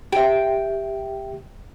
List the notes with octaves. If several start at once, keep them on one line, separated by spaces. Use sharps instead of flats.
G4 E5 G5